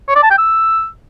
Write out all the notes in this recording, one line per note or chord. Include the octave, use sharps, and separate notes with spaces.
C#5
D5
A5
G5
E6